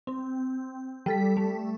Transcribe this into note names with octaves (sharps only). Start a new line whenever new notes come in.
C4
G3 A4 B6
A3